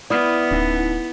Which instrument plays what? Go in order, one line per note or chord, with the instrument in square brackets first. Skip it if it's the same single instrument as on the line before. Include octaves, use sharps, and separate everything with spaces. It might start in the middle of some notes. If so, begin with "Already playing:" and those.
[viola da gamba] B3 [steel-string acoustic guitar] E4 [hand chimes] D5 D#6 F6
[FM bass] D1 [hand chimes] C#4 D#4 F#5